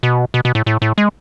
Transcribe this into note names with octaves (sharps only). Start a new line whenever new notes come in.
B2
B2
B2
A2
A2
A2
G#3